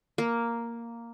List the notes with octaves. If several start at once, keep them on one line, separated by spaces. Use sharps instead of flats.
A#3